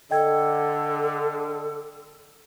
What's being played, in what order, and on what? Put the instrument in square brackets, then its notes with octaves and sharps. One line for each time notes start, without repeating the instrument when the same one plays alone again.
[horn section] D3 [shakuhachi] A4 [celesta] D#5 G5 G#6